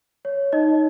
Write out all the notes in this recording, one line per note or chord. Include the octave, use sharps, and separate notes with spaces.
C#5
D#4 D#5